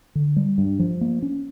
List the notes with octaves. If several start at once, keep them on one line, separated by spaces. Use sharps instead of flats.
D3
G3
G2
F3
A#3
C#4